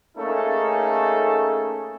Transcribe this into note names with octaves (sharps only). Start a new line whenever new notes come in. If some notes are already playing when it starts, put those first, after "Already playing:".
A3 A#3 C#4 D#4 G#4 A4